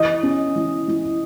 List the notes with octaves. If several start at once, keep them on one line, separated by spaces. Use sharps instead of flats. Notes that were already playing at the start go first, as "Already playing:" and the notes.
Already playing: E3 D#5
C#4
E3
E3